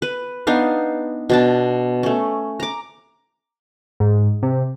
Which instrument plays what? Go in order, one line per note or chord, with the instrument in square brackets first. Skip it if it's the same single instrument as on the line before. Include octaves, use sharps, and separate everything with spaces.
[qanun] B4
B3 D4 D#4 F5
B2 D4 A5
A3 C#4
A#5 D6
[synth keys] G#2
C3